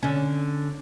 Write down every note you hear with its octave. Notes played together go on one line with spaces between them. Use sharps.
D3 C#4